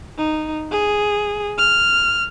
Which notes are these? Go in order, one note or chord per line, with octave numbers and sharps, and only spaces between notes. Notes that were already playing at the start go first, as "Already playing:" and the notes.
D#4
G#4
F6